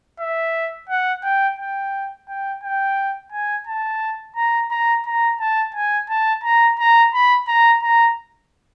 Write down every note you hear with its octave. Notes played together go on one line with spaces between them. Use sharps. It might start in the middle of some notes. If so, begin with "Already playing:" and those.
E5
F#5
G5
G5
G5
G5
G#5
A5
A#5
A#5
A#5
A5
G#5
A5
A#5
A#5
B5
A#5
A#5